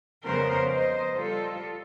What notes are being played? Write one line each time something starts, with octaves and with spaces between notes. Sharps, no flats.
F2 C#3 G3 B3 A#4 C5
C5 D#5
G3 F4 A4